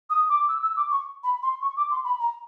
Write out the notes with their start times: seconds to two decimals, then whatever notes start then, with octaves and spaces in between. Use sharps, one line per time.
0.10 D#6
0.30 D6
0.49 E6
0.62 E6
0.77 D6
0.91 C#6
1.24 B5
1.43 C6
1.62 C#6
1.77 D6
1.91 C6
2.05 B5
2.20 A#5